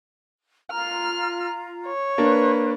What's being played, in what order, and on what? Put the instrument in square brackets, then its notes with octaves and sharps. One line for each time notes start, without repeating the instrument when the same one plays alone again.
[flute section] F4 A#5 [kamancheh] F6
[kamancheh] C#5
[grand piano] A#3 D4 [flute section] B4